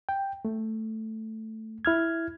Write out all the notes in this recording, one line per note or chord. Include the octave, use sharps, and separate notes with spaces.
G5
A3
E4 F6 G#6